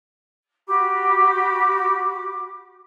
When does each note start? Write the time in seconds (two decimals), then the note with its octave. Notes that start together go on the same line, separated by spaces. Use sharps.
0.67 F#4 G4 B5 D6